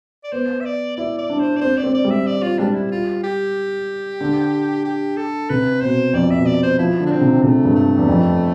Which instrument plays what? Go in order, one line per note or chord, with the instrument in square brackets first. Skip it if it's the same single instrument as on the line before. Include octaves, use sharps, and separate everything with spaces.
[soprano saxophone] D5
[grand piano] B3 [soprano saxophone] C5
[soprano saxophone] E5
D5
[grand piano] E4 [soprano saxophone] D5
[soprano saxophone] D5
[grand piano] D4
[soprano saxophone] C5
D5
[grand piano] C4 [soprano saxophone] C5
[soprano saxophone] D5
[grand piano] C4
[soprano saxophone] D5
[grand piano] G3
[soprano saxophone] E5
D5
F4
[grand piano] G3 [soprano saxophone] D4
[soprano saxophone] E4
F4
G4
[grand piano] D3
[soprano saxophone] G4
A4
[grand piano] C3 [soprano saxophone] B4
[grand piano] B2 [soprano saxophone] C5
[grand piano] F2 [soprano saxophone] D5
[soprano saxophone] E5
[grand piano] B2
[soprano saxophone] D5
C5
[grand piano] F3 [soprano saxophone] E4
[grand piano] D3
[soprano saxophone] D4
C4
[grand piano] C3
[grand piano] C3 [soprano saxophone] A3
[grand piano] G2
[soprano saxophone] A3
[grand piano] E2
F2